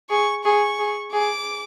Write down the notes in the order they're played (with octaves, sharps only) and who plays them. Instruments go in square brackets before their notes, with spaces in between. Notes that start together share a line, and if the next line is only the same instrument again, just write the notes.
[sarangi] G#4 [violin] C#6
[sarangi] G#4 [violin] C#6
[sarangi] G#4
[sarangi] G#4 [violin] D6